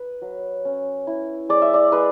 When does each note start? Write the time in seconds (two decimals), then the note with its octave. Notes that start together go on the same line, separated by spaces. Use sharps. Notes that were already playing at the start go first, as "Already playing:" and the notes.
Already playing: B4
0.22 F#3
0.65 C#4
1.07 E4
1.49 G#3 D5
1.62 E5
1.74 D5
1.92 G#3 B4